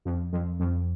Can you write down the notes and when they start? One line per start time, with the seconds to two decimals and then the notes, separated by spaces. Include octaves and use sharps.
0.05 F2
0.33 F2
0.60 F2